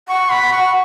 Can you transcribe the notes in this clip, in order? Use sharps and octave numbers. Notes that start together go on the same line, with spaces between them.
F#5 C#6
B5
C#6